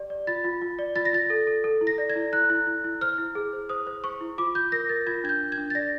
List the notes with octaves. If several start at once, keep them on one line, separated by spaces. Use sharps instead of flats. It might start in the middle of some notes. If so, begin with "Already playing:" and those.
Already playing: G4 D5
D5
F4 A6
F4
F4
D5
F4 A6
A#6
F4 A6
A4
A4
A4
E4
A#6
D5
G#6
E4
E4 F#6
E4
E4
E4
C5 F6
E4
G#4
C5
C5 D#6
C5
C5 C#6
E4
F4 D6
F4 G6
A#4 A#6
A#4 A6
F4 G#6
D4 G#6
G6
D4
G#6
D4
A6
D5 A#6